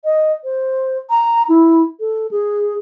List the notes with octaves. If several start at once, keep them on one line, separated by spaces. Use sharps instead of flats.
D#5
C5
A#5
E4
A4
G#4